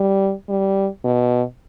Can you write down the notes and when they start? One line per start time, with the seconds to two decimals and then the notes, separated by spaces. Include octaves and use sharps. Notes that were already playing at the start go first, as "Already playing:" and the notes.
Already playing: G3
0.49 G3
1.04 B2